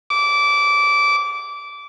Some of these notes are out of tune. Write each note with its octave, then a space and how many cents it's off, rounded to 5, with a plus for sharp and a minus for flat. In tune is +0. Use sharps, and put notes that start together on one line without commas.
D6 -20